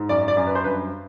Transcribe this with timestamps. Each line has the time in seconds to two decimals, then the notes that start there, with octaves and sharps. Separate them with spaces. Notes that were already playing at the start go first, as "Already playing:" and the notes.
Already playing: G#2
0.09 F#2 D5
0.28 D5
0.37 F#2
0.47 B4
0.55 C5
0.64 G2 B4